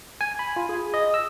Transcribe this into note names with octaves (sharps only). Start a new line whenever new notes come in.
G#5
B5
F4
G#4
D#5
E6